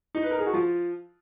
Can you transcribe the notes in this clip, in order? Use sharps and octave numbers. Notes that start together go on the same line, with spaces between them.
D#4
B4
A#4
G#4
F#4
F3 F4